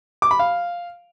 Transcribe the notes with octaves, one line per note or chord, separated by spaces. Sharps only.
D6
B5
F5